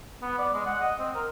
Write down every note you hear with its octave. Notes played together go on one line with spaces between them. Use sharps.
B3
D5
G#3
F#5
D#5
C4
A#4